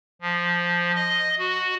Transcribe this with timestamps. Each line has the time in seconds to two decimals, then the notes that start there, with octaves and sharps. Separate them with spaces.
0.21 F3
0.95 D#5
1.39 F#4